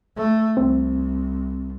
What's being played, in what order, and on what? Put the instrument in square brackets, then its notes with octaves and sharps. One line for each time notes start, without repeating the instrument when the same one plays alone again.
[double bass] A3
[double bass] C2 [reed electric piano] C4